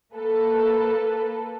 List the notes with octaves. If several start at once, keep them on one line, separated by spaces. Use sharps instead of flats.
A#3 A4 B4